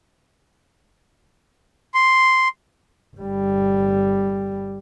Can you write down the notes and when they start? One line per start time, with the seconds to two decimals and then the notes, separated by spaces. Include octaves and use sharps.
1.94 C6
3.17 G1 G3